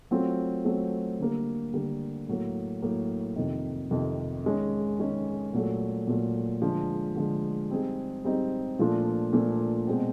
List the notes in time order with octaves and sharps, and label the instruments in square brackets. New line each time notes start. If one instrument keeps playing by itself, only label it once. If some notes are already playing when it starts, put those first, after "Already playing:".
[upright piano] F#3 A3 C4 F4
F#3 A3 C4 F4
D3 G3 A#3
D3 G3 A#3
A2 F#3 A#3
A2 F#3 A#3
F2 C3 D#3
F2 C3 D#3
D#3 G#3 C#4
D#3 G#3 C#4
A#2 F#3 A3
A#2 F#3 A3
D3 F3 G#3
D3 F3 G#3
G3 C4 D#4 G#4
G3 C4 D#4 G#4
A#2 F3 A3 D4 F4
A#2 F3 A3 D4 F4
B2 G#3 C4